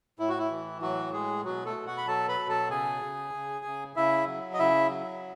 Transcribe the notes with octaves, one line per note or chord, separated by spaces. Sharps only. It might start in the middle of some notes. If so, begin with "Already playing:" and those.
A2 E4
F#4
E4
E3
A2 F#3 F#4
G#3 G#4
B2 F#3 F#4
A3 A4
B2
F#4 F#5
B5
F#3 A4 A5
B4 B5
B2
A4 A5
C#3 G#4 G#5
C#3
C#3
C#3
C#3 E4 E5
F#3
D#5
C#3 E4 E5
F#3